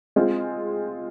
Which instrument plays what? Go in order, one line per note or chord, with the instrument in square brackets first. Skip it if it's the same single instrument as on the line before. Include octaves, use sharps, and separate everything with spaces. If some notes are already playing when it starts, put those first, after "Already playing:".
[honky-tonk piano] G#3 C4 F4